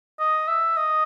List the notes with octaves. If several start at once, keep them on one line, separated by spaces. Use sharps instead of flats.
D#5
E5
D#5